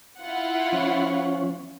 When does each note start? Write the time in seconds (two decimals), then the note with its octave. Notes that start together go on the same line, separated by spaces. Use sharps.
0.20 E4 F4 F#5
0.72 F3 C#4